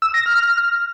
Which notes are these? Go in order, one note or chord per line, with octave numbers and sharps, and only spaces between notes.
E6
A#6
F6